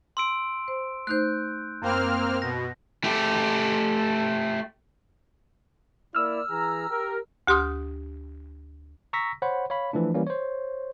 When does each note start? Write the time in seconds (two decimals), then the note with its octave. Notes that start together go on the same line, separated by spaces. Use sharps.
0.17 C6 E6 D7
0.68 C5
1.07 A3 D#4 C5 F#6 G6
1.82 F#2 A#3 C4 G5 B5 F6
2.42 B2 A#6
3.04 A3 G4
6.15 A#3 E4 D5 E6 F6
6.50 E3 G#4 A#5
6.89 G4 A#4
7.47 D2 G4 C6 D#6 F6
9.13 A#5 C#6 E6 A#6 B6
9.42 C5 C#5 F#5 B5
9.70 C#5 F5 B5
9.93 E3 F3 A3 D4
10.14 E3 G3 A#3 C#4
10.27 C5 C#5